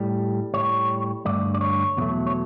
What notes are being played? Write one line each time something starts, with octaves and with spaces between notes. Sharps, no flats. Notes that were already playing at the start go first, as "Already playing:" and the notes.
Already playing: A2 G3
A2 G3 C#5
G2 D3 A3 D5
D5
C#5
E2 B2 F#3 A3
C#5